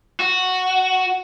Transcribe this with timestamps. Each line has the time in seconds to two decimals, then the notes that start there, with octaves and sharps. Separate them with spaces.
0.20 F#4